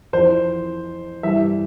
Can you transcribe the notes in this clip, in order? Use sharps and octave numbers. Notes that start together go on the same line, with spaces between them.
F2 E3 C5
G2 E3 E5